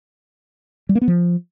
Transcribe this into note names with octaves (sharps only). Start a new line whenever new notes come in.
G3
A#3
B3
F3